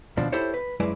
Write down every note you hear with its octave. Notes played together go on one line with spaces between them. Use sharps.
D#2 B2 F3 D4
E4 G4 A4 C5 C#5
B4
F#2 G#3 E4 B4 D5